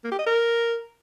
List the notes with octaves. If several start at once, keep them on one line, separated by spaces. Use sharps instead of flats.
A#3
G4
D#5
A#4